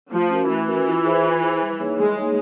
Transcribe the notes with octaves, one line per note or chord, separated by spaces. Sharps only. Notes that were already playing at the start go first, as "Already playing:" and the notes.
F3 A3
C#4 F#4 A#4
E3 A3
C#4 F#4 A#4
F4
G#4 C5 E5
F4
G#4 C5 E5
G3
A#3 D#4 G#4 C#5
G3 G#3
A#3 D#4 G#4 C#5